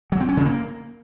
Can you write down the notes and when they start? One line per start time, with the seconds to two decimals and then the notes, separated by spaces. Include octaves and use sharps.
0.12 F#3
0.20 C4
0.29 C#4
0.37 C#3
0.45 A#3